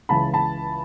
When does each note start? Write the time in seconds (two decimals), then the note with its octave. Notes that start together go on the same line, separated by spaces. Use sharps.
0.09 C#2 C#3 E3 A5 B5
0.33 A5 B5